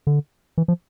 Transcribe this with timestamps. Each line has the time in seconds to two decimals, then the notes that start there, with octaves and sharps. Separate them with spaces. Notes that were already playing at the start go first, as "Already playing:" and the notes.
0.07 D3
0.58 E3
0.68 F3